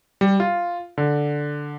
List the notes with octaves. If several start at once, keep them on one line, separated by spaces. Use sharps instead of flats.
G3
F4
D3